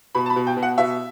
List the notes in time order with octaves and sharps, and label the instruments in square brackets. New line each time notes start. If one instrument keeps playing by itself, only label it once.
[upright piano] B2 B5
A5
B5
B2
G5
B2
F#5
B2 E5